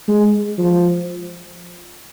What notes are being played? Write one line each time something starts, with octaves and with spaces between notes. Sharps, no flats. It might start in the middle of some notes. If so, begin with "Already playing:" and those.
G#3
F3